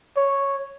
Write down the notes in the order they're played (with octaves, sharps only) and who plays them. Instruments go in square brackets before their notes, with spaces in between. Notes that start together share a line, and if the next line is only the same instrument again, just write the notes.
[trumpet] C#5